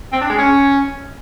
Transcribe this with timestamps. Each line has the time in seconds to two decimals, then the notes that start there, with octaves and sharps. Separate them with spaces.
0.13 C4
0.21 D4
0.30 G#3
0.38 C#4